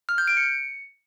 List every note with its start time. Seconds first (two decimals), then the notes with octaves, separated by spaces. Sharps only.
0.09 F6
0.18 G6
0.28 D7
0.37 C#7